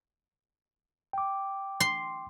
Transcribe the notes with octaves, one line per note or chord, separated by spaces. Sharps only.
G5 D6
C6